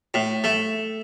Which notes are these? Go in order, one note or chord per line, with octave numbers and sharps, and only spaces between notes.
A2
A3